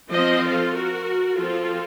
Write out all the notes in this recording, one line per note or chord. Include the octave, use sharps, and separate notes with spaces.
F3 C4 C5 D#5
F4 A4
F#4 A#4
F3 C4 F4 A4